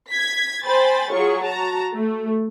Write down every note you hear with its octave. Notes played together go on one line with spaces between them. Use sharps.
G#6 B6
C5 G5 G#5 B5 A6
F#3 F4 G#4 C#6
F#4 A5 A#5
A3